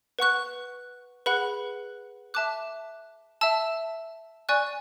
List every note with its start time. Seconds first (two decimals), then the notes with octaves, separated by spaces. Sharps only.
0.19 B4 F#5 C#6 F#6
1.26 G#4 B4 F#5 B5 F#6
2.34 E5 A5 D6 F#6
3.41 E5 A5 E6
4.49 D5 G#5 C#6 F#6